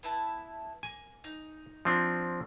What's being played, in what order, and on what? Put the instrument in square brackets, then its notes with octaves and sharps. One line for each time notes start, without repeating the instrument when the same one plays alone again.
[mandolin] B3 E4 A5
[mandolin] A#3 [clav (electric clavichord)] G#5
[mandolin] D#4
[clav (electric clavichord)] F3 C4 D4